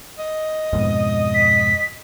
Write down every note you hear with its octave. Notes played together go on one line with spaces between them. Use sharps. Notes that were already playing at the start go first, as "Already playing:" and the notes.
D#5
F2 G#2 B2
B6